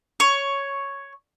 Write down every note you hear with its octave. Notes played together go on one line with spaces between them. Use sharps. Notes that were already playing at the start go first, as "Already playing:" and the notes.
C#5